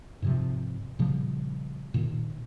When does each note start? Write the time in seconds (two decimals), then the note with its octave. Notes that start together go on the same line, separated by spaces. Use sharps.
0.22 G#2 C3 F3
0.99 A#2 C#3 F3 G3
1.94 A#2 D#3